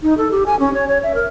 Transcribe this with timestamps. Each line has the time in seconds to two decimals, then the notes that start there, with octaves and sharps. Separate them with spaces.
0.03 D#4
0.18 A4
0.31 G4
0.46 G#5
0.60 C#4
0.74 C#5
0.88 C#5
1.03 E5
1.15 A#4